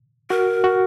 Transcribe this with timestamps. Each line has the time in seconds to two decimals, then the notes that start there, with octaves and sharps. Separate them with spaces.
0.30 F#4 A#4
0.64 F#4